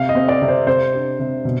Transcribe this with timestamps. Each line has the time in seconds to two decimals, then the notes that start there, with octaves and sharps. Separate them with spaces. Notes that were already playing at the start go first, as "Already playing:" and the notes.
Already playing: C3 F5
0.09 D#5
0.15 C4
0.29 D5
0.42 C3
0.48 C5
0.67 C3 C5
0.94 D4
1.19 C3
1.45 B2